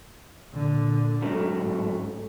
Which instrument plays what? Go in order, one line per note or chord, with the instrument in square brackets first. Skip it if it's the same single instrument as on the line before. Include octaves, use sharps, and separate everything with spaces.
[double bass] A#2 D3
[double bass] G#2 [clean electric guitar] C#3 F#3 A3